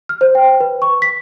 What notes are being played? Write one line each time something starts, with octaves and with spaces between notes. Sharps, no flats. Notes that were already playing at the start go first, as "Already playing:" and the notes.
F6
C5
G5
B4
C#6
B6